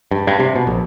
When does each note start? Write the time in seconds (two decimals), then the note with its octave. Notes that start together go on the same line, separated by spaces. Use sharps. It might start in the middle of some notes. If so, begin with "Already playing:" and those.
0.11 G2
0.27 G2
0.40 C3
0.55 B2
0.67 A#1